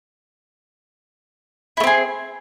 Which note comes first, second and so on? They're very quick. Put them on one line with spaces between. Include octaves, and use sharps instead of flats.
E4 A3 C4 G#4